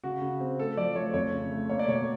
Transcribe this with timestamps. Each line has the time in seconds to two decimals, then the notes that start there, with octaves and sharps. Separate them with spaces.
0.04 C#3 F#4
0.22 C#3
0.40 C4
0.59 A3 A4
0.77 F3 D5
0.95 A3 C#5
1.14 F2 C#5
1.33 C#3
1.51 A3
1.69 A#3 C#5
1.79 D5
1.88 B2 C#5